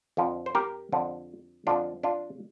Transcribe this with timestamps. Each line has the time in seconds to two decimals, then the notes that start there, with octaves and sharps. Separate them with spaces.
0.17 F2 D3 F3
0.46 C5
0.55 G4 A#4
0.92 F2 D3 F3
1.67 F2 D3 F3 D4 F4
2.03 D4 F4